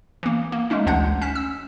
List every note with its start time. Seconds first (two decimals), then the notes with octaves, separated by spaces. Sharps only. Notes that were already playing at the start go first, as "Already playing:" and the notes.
0.23 E3 A#3
0.52 A#3
0.70 G#3 A3 C#4 D#4
0.86 A1 D2 G#3 D4 F#5 G6
1.21 C#4 F#6 B6 E7
1.35 E6